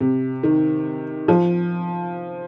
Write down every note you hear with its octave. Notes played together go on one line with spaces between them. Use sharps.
C3
D#3
F3